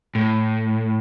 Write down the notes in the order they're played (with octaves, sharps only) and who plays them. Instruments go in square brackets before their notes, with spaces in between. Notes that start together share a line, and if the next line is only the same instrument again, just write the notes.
[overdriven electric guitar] A2